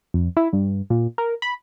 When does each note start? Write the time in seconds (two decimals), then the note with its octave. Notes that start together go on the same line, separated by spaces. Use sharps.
0.14 F2
0.37 E4
0.53 G2
0.90 A#2
1.18 A#4
1.42 B5